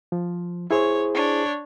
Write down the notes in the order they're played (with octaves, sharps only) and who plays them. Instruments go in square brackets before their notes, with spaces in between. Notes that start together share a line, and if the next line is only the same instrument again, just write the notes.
[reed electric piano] F3
[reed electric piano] E4 G#4 C5 [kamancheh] C#5
[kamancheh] D4 C#5